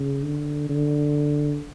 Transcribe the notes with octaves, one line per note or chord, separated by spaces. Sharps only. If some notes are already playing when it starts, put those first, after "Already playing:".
Already playing: C#3
D3
D3